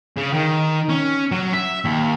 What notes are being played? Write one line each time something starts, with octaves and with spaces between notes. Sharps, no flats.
C#3
D#3
C#4
F#3
E5
D#2